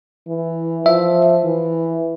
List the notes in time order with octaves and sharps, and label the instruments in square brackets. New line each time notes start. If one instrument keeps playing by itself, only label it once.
[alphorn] E3
[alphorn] F3 [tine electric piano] E5
[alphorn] E3